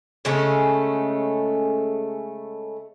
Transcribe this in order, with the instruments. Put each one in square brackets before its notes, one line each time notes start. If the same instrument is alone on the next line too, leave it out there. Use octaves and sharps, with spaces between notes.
[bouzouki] C#3 G#3 A3 C#4